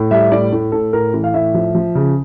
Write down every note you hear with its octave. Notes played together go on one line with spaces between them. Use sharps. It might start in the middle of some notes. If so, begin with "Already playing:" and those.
Already playing: A2
G3 E5
A2 D5
A2
A2 A4
A2 A#4
E3
F5
A2 E5
F3
F3
C#3